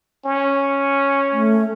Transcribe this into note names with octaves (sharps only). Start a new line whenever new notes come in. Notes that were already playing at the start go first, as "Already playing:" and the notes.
C#4
A3